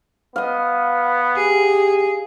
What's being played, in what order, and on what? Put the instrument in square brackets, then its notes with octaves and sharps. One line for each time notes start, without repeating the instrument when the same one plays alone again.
[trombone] B3 [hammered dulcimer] D#5 F5
[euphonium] G4 [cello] G#4